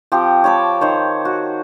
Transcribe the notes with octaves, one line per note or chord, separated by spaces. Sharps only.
F3 C4 G4
C#5 A5 B5 D6
D#3 C5 C#5
F#4